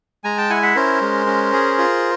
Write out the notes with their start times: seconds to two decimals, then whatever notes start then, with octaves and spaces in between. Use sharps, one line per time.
0.24 G#3 G#5 A#5
0.38 G5 A5
0.50 E4 F#5 G#5
0.62 E5 F#5
0.75 C#4 A#4 C5
1.01 G#3
1.27 C#4
1.53 G#4
1.78 F4